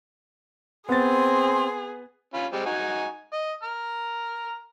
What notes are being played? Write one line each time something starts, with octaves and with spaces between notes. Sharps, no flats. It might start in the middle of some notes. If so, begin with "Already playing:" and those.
B3 C4 G#4 C6 A6
C#4 F4 B5
G3 G#3 C4
D#4 F#4 G#5
D#5
A#5 F6